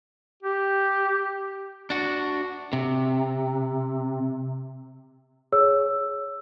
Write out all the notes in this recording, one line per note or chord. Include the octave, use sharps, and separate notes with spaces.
G4
D4 F#4
C3
G#4 C#5 E6